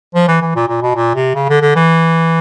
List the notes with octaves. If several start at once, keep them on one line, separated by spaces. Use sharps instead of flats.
F3
E3
E3
A#2
A#2
B2
A#2
C3
C#3
D3
D3
E3